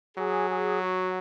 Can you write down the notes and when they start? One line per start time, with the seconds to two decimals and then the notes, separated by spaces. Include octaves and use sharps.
0.17 F#3 G#4
0.48 G#4
0.81 F#4